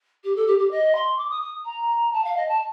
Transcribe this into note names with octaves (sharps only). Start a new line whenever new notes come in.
G4
A4
G4
G4
D#5
C6
D6
D#6
D#6
A#5
A5
F5
D#5
A5